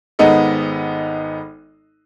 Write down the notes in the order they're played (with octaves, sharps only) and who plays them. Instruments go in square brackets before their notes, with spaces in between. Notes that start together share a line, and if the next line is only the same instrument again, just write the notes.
[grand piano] G#1 G#3 B3 D#4 A4 D#5